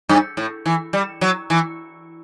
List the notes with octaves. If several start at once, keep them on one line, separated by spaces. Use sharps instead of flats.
G2
A2
E3
G3
F#3
E3